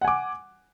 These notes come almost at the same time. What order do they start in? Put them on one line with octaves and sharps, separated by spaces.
F#5 G#5 D6